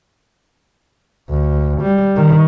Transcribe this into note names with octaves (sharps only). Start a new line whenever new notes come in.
D2
G3
D#3